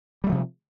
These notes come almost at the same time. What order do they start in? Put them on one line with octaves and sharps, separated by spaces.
G3 A3 F3 C3